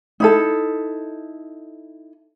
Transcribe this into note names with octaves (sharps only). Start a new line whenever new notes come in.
D#4 E4 A4